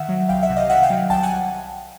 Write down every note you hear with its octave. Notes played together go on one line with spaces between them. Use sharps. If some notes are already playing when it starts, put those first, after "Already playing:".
Already playing: D#3 E5 F#5
F#3
C2 F5 G5
E5 F#5
C3
D#5 F5
D#3 E5 F#5
F5 G5
F#3
C2 G5 A5
F#5 G#5